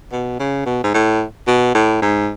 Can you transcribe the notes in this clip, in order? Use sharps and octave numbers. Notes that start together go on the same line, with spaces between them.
B2
C#3
B2
G#2
A2
B2
A2
G#2